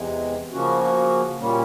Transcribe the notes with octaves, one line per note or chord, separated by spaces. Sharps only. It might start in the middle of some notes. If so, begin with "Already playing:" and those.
Already playing: E2 C3 E3 G#3
C#3 F3 A#3 C#4 F#4
A#2 G3 A#3 C#4